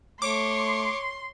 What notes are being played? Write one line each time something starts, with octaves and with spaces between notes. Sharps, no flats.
A3 C#5 C6 D6